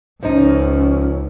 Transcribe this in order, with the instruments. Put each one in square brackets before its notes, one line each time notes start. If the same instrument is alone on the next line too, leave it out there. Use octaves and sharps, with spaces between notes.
[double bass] C#2 [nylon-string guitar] F3 D#4 [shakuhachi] C#4